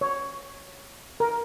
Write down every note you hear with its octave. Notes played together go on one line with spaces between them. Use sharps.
C#5
A#4